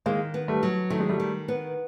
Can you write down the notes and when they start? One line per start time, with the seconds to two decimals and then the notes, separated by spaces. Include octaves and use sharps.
0.06 D#3 G#3 A#3
0.34 B3
0.48 G3 A3
0.63 F#3
0.90 D#3 A3
1.00 G#3
1.09 G3 A3
1.20 D#3
1.48 B3